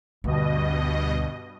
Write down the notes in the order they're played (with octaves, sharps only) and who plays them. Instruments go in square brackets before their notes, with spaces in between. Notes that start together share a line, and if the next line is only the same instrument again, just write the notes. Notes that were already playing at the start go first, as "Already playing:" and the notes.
[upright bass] D2 [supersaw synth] G2 B2 D#5